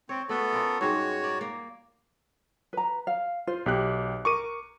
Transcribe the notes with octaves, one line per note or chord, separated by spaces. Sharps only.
C4 C#5
A3 B3 F#4 A4 E5
C#4 F4 A#4
G#2 G3 G#3 F#4 C#5
A#4 D5
A#3
B4 A#5
F5
F4 C5
B1 G4 F#6
A#4 C#6 D6 D#7